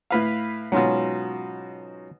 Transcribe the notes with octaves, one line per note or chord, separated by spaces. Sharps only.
A2 B4 F5
G#2 B2 F#3 C#4 F4